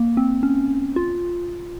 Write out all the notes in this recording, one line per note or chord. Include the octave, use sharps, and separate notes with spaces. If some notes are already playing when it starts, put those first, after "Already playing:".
Already playing: A#3
C4
C#4
F4